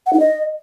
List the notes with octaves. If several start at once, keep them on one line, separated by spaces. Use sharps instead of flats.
F#5
D#4
D#5